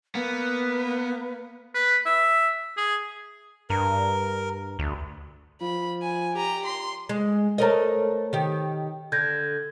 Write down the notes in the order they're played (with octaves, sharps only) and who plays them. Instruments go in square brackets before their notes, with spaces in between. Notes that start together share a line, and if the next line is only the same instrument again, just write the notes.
[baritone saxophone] A#3 [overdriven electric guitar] B3 [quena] B4
[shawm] B4
E5
G#4
[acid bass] G2 [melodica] A#4
[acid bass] D2
[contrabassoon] F3 [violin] B5
[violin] G#5
G4 A#5
C6
[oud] G#3
[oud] A3 A#4 D#5 [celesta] C5 C#5 A#5
[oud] D#3 G4
[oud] D3 [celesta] G6 G#6 A#6